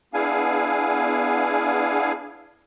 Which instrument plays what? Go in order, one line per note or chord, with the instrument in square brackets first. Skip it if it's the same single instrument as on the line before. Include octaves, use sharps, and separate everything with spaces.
[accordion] B3 D4 E4 G#4 F5 G#5